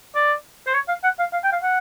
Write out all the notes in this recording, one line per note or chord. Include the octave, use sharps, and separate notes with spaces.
D5
C5
C#5
F5
F#5
F5
F5
G5
F5
F#5